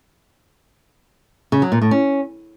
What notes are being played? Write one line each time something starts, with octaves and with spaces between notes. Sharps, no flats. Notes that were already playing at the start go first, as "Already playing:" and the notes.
C#3
F#3
A#2
A2
C#4